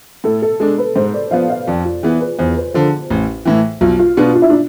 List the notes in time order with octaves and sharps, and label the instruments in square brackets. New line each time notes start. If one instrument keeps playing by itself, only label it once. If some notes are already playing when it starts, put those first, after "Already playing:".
[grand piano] A2 [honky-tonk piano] A4
[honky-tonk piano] A4
[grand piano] G#3 D4 [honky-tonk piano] A4
[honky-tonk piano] B4
[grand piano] G#2 [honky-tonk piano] C5
[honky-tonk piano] D5
[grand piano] F3 B3 [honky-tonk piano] F5
[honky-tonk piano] F5
[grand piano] F2 [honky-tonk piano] D5
[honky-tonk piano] F4
[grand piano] E3 B3 [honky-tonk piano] G#4
[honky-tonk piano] B4
[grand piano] E2 [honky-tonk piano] C5
[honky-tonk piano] B4
[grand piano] D3 F3 [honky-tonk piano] C5
[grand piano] A1
A2 E3
[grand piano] B1 [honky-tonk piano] F4
[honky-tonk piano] F4
[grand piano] B2 B3 F4 [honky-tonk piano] D4
[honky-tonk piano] F4
E4
D4